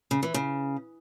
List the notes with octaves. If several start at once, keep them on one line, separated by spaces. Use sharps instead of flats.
C#3
E3
C#3